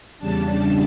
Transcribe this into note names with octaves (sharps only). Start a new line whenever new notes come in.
E2 C#3 G3 D4 A5